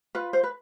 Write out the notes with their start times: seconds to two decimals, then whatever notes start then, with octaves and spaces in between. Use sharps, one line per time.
0.15 F4 B4
0.33 C5
0.43 B4